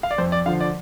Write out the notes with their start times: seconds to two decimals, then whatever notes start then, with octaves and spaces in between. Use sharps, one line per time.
0.03 F5
0.11 D5
0.18 F2 C5
0.32 D5
0.46 D3 F3 F5
0.60 D5